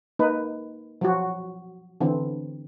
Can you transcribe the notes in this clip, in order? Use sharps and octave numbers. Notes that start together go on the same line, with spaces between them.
A#3 D#4 B4
F3 F#3 F#4
D3 E3 C4